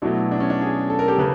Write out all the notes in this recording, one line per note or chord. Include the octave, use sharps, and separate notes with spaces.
B2 F#3 A3 D4 E4
D4
C#4
D4
F#4 G#4
A4
A#4
G4 A4
C#3 A4 B4